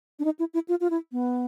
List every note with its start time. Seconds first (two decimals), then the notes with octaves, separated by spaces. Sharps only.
0.19 D4
0.25 D#4
0.39 E4
0.54 E4
0.69 F4
0.81 F4
0.90 E4
1.12 B3